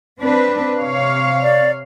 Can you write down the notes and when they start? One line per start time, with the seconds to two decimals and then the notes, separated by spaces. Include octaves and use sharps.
0.20 C4 D4 B4
0.77 C3 C#5 F5
1.43 D5